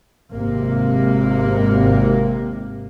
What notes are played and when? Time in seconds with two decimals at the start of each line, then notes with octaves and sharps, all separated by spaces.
0.30 G#1 C3 A#3